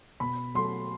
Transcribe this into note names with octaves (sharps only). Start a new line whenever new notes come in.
B2 B5
F#3 A3 C6